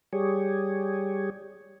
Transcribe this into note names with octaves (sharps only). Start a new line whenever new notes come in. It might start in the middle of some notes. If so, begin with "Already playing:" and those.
G3 G4 G#4 C#5